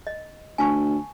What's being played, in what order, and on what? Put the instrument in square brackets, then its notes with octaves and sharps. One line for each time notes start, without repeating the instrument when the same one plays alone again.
[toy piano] D#5
[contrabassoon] D2 [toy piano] G#5 A5 C#6